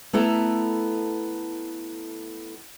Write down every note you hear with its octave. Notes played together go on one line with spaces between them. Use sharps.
A3 B3 E4 A4 A#5